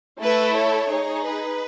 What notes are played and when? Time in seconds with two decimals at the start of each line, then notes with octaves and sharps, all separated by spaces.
0.22 A3 E4 A4 B4
0.56 C#5
0.90 D#4 G#4
1.24 B4